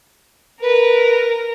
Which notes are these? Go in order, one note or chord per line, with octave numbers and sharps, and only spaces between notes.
A#4 B4